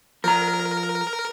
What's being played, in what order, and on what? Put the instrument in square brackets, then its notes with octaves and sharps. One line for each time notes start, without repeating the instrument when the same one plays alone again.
[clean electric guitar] F3 A#5 [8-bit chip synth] A#4